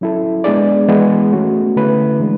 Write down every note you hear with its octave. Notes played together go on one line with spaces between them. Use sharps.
F#3 C#4 E4 A4
G#3 B3 D4 G#4 D5
E3 G#3 B3
A3 C#4 F#4
D3 A3 C#4 E4 B4
E3 G#3 D4